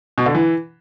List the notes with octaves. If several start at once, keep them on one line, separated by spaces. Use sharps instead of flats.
B2
D3
E3